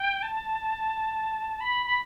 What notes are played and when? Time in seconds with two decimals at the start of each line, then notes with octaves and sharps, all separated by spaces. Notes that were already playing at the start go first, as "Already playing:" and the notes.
Already playing: G5
0.22 A5
1.60 B5
1.86 B5